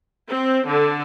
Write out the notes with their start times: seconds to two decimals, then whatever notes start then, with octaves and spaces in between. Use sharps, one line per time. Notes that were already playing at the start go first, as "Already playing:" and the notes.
0.29 C4
0.65 D3